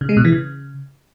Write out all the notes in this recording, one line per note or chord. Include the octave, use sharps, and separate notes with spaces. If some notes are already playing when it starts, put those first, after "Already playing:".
C#3
G#3
B2
E3
C#3